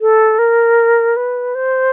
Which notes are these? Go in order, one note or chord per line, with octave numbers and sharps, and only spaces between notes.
A4
A#4
B4
C5